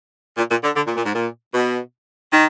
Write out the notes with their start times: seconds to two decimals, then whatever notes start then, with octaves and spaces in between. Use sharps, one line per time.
0.37 A#2
0.50 A#2
0.63 D3
0.76 D3
0.86 A#2
0.96 A#2
1.05 G#2
1.15 A#2
1.54 B2
2.33 D#3